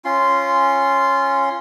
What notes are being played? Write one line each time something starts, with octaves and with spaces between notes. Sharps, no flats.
C#4 F4 C6